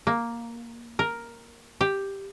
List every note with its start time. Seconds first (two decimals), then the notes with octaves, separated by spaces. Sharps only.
0.07 A#3
0.99 A#4
1.81 G4